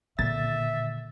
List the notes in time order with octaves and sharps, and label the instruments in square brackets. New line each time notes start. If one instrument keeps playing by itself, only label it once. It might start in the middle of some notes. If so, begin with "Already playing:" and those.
[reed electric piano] A#2 [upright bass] D3 D#3 [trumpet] E5 [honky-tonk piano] A6